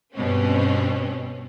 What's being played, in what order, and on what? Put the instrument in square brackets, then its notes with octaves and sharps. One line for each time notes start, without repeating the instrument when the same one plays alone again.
[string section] G2 B2 C4 C#4